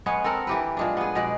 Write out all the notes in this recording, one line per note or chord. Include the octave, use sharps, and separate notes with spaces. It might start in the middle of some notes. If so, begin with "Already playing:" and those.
G#3 B3 C#4 C#5
C4 A4 A#4 F#5
E3 G4 B4
A#2 G#3 D4
B3 G#4
B2 G#3 D5